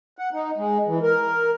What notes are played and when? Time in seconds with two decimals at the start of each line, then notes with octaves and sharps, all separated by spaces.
0.18 F#5
0.33 D#4
0.57 G#3
0.87 E3
1.02 A#4